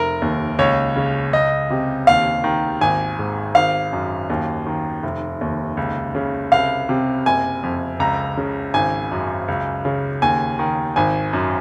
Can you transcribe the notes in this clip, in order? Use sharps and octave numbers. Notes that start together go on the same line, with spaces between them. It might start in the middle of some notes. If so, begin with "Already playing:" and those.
Already playing: F1 A#4
D#2
C#2 C#5
C#3
C#2 D#5
C3
D#2 F5
D#3
G#1 G#5
G#2
G#1 F5
F#2
D#2
D#3
F1
D#2
C#2
C#3
C2 F5
C3
F#1 G#5
F2
C#2 A#5
C#3
G#1 G#5
F#2
C#2
C#3
D#2 G#5
D#3
G#1 G#5
F#2